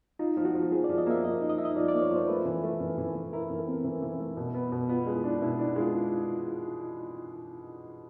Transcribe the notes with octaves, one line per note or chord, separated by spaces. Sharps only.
D#4 F4
F3
F#4
F3
F3 G#4
F3 D5
D#5
A#3 E5
F3 D#5
D#4
D#5
D#4 E5
D#5
F3 D5
A#3 D5
C#5
F3 C5
A3 B4
E3
A3
E3
E3
E3
E4 A#4
E3
A4
C4
E3
E3
A3
B2
B3
B2
B3 F4
G#3
E4
D4
D#4
B2 E4
D4 D#4
E4
G#3 F4